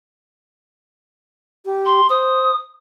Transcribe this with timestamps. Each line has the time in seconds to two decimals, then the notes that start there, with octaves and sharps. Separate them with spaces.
1.65 G4
1.86 C6
2.10 C5 D#6